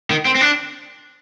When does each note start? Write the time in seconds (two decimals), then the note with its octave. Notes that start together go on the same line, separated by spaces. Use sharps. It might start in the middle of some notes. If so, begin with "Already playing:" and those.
0.10 D#3
0.25 C4
0.35 C4
0.41 D4